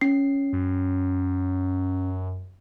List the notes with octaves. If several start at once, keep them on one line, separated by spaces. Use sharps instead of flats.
C#4 C7
F#2